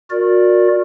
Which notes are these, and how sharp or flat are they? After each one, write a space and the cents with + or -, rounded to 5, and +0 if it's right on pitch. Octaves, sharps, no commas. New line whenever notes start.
F#4 -35 A#4 +0 D5 +0